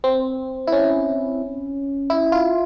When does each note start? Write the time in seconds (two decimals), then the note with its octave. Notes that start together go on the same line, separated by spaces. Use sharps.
0.04 C4
0.67 E4
0.72 C#4
2.10 E4
2.32 F4